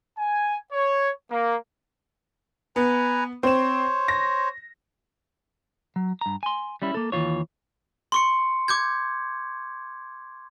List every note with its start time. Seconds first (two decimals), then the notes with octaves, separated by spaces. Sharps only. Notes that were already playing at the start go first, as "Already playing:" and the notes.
0.19 G#5
0.72 C#5
1.31 A#3
2.76 B3 B4 G#5 A#5
3.43 C4 C5 C#5 E7
4.08 A#6
5.96 F#3
6.21 G2 A#5
6.43 G#5 C6
6.82 G3 C#4 E4
6.94 A#3 A4
7.12 D#2 E3 F4 C#5
8.12 C6 C#6 C#7
8.68 D6 G6 G#6